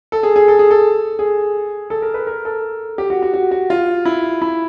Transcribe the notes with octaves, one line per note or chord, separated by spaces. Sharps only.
A4
G#4
G#4
A4
G#4
A4
G#4
A4
A#4
B4
A#4
A4
G4
F#4
F#4
F#4
F#4
F4
E4
E4